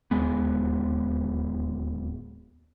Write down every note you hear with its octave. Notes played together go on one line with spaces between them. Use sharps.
D1 D#2 G#3 B3